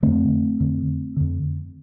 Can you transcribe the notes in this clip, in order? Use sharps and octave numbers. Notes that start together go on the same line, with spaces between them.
F2 D3 A3 C4
F2 D3
F2 D3